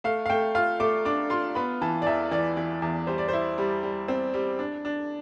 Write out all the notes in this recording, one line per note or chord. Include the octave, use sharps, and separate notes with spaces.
A3 F5
F5
A3 G5
F4 F5
A3 D6
D4 D6
F4 C6
B3 B5
E3 A5
D5
E2 E5
E3 D5
E3
E2
G3 C5
D5
E4 C5
G3
G3
C4
G3
D4
D4